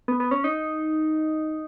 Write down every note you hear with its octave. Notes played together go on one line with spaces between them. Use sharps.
B3
B3
C#4
D#4